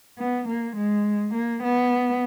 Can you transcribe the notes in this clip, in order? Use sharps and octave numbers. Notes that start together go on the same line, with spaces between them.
B3
A#3
G#3
A#3
B3